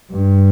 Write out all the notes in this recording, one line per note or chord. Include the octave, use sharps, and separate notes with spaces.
G2